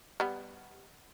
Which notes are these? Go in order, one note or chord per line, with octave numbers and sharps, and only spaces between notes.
G3 B3